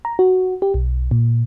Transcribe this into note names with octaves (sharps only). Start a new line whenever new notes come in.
A#5
F#4
G4
B1
A#2